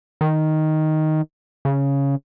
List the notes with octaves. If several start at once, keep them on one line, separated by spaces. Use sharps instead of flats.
D#3
C#3